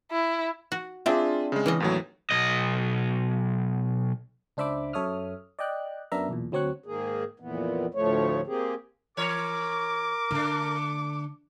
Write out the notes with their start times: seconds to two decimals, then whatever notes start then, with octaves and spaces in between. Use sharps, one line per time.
0.12 E4
0.72 F#4
1.06 C4 D4 F4 G#4 E5
1.52 C#3 G#3
1.66 E3 C#4 D#5
1.80 D#2 A2 F#3
2.31 B1 D#5
4.57 C#2 D4 C5 E5 B5 D6
4.93 F#2 A4 C#5 E5 D#6 F6
5.59 D5 D#5 G5 F#6
6.12 F#2 B3 D4 A#4 E5 A#5
6.29 B1 E2 A#2
6.52 D2 F#3 C4 C#5 C#6 F#6
6.86 G#2 D#3 A#3 G#4
7.40 F2 A#2 E3 B3
7.94 D2 A2 F3 A3 C#5
8.47 A#3 C4 G4 G#4
9.17 E3 A#4 C#5 D6
10.31 D3 A3 D4